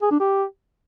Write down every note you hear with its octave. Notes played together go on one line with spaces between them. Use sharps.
G#4
D4
G4